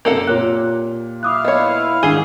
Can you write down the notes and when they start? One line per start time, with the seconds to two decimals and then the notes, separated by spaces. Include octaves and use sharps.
0.05 F#2 C3 A#3 A4 F#5
0.28 A#2 F4 G4 C#5 F#6
1.23 E4 F5 D6 D#6 F#6
1.45 B3 C#5 D#5
2.03 G#1 D4 G#4 C7 D#7 G7